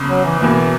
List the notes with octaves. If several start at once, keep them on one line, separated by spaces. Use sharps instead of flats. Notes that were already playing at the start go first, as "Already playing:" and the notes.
Already playing: F#1 E2 C#3
F#3
E3
E1 E2 B2 E3 A#3